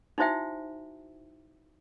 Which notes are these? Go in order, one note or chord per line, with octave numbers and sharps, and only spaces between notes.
D#4 E4 F#4 C5 E5 G5